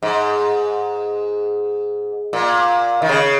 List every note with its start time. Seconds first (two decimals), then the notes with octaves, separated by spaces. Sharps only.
0.03 G#2
2.33 A#2
3.02 D#3
3.09 C#3